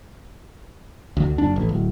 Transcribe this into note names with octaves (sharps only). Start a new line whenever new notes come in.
D2
F#1 D4
A1
D1